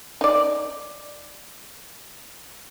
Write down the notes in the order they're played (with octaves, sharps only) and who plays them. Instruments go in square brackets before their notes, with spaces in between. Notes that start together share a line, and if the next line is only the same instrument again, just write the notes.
[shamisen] D#4 D5